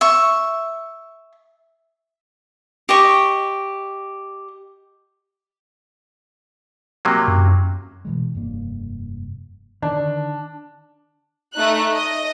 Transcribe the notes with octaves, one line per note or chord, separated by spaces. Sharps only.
E5 C#6
G4 D#5 C#6
C3 F#3 A#3
F#2
B2 E3 G#3
F1 G2 A#3
D3 D#3 D4
A3 D#4 F#6
D#5